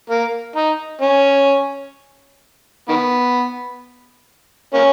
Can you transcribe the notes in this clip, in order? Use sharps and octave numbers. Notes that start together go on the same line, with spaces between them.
A#3
D#4
C#4
D#3 B3
A#3 C#4